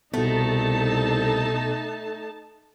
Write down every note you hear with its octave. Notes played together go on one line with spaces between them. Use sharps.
C2 B2 A3 B3 D#4 A4 A5